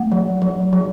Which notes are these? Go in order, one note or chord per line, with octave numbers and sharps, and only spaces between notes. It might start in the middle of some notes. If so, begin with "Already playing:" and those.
Already playing: A3 F#5
F#3
F#3
F#3